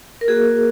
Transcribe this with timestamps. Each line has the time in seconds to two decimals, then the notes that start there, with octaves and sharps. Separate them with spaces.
0.21 A#4
0.28 A#3 F#4 G#4